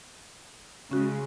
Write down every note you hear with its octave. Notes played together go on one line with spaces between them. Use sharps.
C#3 G#3 C#4 F#4